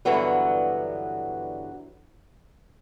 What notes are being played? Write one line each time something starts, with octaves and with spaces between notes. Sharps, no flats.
G2 D3 E3 F#3 B3